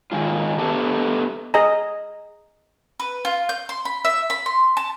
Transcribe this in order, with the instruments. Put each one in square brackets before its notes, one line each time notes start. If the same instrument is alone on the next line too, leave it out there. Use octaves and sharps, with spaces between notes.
[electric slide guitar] D#3 G#3 F4
A3 B3 D#4 G4 A4
[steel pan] G#4 D#5 G#5 A#5
[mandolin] B4
F4
G6
C6
B5
E5
B5
C6
A5